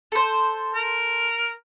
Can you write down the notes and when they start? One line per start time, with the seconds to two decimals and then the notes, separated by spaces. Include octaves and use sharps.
0.12 A4 C5
0.75 A#4